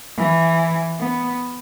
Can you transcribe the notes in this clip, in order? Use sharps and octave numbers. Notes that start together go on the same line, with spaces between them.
E3
B3